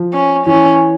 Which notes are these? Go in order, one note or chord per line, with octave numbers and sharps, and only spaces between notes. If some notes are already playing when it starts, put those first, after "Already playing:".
Already playing: F3
C#4
E3 C#4